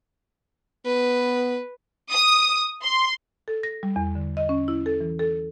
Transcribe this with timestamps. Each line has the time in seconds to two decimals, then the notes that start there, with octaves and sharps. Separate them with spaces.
0.86 B3 B4
2.11 D#6
2.83 C6
3.48 A4
3.63 A#6
3.83 G3
3.96 E2
4.15 D3
4.37 D#5
4.49 C#4
4.68 E4
4.86 A4
5.00 E3
5.19 A4